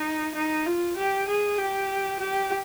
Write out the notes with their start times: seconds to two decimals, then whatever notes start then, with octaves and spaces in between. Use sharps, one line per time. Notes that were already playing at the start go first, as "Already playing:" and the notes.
Already playing: D#4
0.35 D#4
0.66 F4
0.96 G4
1.28 G#4
1.58 G4
2.19 G4